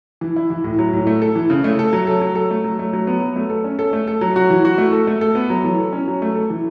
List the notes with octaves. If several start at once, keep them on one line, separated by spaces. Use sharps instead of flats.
E3
E4
E3
A2
F#3
A2
A3
A4
E3
C#3
A3
A4
F#3
A4
F#3
A4
A3
F#3
A3
F#3
B3
F#3
A3
A4
C#4
A4
A3
A4
F#3
F#4
E3
F#4
A3
A4
A3
A4
B3
F#3
E3
A4
C#4
F#3
A3
A4
E3